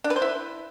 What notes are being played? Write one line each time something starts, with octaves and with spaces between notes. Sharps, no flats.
D4
B4
C5
E4